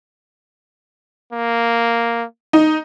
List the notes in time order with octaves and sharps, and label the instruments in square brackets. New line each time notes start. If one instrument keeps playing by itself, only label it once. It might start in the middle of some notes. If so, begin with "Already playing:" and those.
[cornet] A#3
[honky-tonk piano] D#4